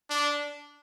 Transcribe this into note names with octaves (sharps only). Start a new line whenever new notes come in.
D4